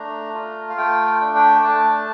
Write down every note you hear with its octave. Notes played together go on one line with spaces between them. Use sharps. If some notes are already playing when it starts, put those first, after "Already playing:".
Already playing: A3 D4 A#5
F4
F5
A3 G5
G5
D4
G5
G5
A3 A5